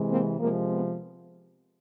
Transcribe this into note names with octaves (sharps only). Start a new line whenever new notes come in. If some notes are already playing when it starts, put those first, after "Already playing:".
Already playing: C3 E3 G#3
A#3 C4
C3 F3 G#3 A#3
B3